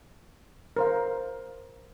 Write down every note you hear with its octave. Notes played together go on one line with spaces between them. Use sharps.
A#4 C5 F5